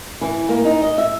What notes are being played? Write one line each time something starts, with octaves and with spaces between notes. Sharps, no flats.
E3
A#3
D#4
D#5
E5